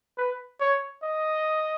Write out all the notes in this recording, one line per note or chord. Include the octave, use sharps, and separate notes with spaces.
B4
C#5
D#5